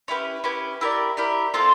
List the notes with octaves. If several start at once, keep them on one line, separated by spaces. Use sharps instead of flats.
C#4 E4 G4 B4
C#4 E4 G4 B4
E4 G4 A#4 D5
E4 G4 A#4 D5
C4 F4 A4